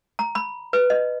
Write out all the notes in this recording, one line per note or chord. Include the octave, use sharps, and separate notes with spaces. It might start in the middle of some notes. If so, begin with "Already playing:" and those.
A#5
B5
B4
D#5